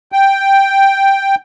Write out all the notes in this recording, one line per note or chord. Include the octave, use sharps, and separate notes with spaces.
G5